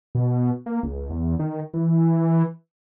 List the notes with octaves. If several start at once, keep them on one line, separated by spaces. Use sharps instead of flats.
B2
A#3
C#2
E2
D#3
E3